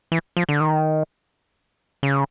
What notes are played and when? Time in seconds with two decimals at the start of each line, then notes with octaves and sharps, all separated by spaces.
0.12 E3
0.37 F3
0.49 D3
0.60 D#3
2.03 C#3